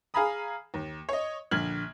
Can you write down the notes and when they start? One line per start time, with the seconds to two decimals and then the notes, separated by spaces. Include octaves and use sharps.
0.14 G#4 F5 G#5 A#5 B5 D#6
0.74 D#2
1.09 C#5 D#5
1.51 A#1 D3 F6 G#6 F#7